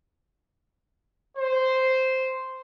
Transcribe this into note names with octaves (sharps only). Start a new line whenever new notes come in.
C5